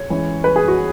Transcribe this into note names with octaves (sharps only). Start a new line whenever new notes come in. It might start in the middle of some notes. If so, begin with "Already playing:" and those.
Already playing: C#5
E3 G#3 C#4
B4
G#4
F#4